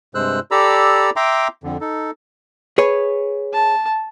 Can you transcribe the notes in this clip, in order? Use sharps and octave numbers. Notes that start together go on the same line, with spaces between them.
G2 C3 G#3 C5 E6 F#6
G4 A4 D5 A#5 B5 E6
E5 G5 A#5 C6 D6
F2 D3
D#4 A4
G#4 B4 C#5
A5